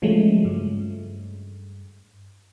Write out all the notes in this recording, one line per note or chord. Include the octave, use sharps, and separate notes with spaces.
C#3 F3 F#3 G#3 A3 C#4
G2